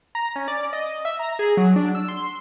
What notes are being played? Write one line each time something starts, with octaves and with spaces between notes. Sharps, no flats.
A#5
C#4
D5
D#5
E5
A#5
G#4
F#3
D4
E6
C6